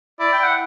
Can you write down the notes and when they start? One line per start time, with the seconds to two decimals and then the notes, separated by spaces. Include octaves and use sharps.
0.20 E4 D5
0.33 G5
0.43 F#5